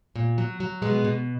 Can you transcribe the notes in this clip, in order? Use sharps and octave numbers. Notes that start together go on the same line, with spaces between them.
A#2
F#3
F#3
B2 G#3 B3
B2